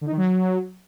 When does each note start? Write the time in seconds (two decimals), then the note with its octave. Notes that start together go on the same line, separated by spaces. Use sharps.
0.01 D3
0.07 D#4
0.12 D#3
0.17 F#3